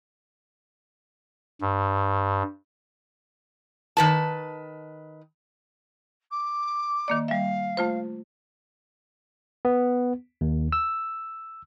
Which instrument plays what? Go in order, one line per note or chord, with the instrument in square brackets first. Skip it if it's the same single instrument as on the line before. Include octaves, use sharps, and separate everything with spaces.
[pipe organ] G2
[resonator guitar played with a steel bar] D#3 B4 A5
[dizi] D6
[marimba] D#3 A#3 D5
[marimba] G3 E5 [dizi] F5
[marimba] A3 F4 C5
[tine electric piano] B3
D#2
E6